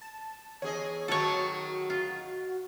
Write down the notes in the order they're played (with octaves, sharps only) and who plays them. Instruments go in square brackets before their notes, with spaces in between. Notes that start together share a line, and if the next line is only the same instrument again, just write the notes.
[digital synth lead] A5
[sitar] E2 G#4 D#5 [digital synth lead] C#5
[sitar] D#3 F#3 A3 [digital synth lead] F#4 [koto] A4 C#5
[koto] F4